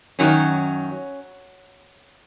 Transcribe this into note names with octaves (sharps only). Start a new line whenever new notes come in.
F#2 D#3 F#3 C#4